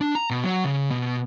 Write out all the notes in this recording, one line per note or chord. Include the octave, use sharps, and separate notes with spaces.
D4
A#5
B2
F#3
C#3
B2